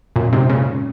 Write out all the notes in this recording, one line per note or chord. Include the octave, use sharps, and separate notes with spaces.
F#2 A#2
G#2 C3
A#2 C#3